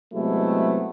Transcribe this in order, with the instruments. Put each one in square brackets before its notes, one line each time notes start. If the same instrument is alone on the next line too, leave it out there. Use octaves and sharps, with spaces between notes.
[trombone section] C3 F#3 G#3 A3 B3 E4